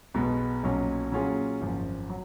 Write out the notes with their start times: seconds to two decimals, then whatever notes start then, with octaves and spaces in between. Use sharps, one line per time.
0.14 B1 B2 G#3 B3
0.63 B1 A#2 F#3 C#4
1.12 A#2 F#3 C#4 F4 G#4
1.61 G#1 F#2 C#3 F3
2.10 F#3